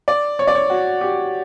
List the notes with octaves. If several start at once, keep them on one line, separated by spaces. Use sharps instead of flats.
D5
C#5
D5
C#5
F#4
G4